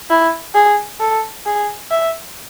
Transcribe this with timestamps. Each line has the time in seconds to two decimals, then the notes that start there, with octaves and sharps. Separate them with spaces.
0.10 E4
0.55 G#4
1.00 A4
1.46 G#4
1.91 E5